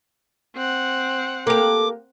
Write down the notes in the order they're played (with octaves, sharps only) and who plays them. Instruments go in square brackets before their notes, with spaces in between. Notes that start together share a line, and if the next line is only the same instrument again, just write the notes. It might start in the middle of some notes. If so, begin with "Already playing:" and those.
[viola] C4 F#5
[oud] A#3 G4 [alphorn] A4 [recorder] D6